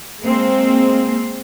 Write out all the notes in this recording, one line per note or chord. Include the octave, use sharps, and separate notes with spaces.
G#3 A#3 C4